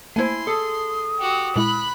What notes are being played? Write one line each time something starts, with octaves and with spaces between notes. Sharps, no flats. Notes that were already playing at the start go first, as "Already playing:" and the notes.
A3 A#3 E4 C5 G#5 C6
G#4 A4 D#6
F#4 G4
A#2 G#3 E4 B5 F#6